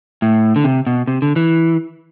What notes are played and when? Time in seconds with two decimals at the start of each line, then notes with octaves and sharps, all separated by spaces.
0.22 A2
0.56 D3
0.64 C3
0.87 B2
1.07 C3
1.22 D3
1.36 E3